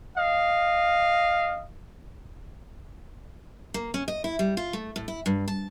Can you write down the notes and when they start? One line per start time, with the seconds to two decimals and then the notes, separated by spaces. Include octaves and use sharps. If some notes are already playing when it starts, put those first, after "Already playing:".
0.16 D#5 F5
3.74 A#3
3.94 C#4
4.08 D#5
4.24 E4
4.39 G3
4.57 F4
4.73 A3
4.96 A2
5.08 E4
5.26 G2
5.48 A5